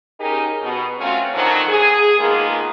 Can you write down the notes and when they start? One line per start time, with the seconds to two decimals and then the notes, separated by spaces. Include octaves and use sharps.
0.20 C#4 D#4 G4 G#4 A#4
0.62 B2
0.98 F#3 A3 C4 C#4 F4 F#4
1.34 A#2 D3 D#3 F3 F#3
1.69 G#4
2.19 B2 D#3 G#3 A#3 B3 F4